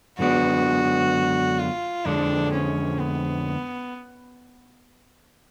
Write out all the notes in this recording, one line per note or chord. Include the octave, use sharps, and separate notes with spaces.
F#2 D3 G#3 B3 D4 F#4
F4
F2 D3 G#3 D4
C#4
B3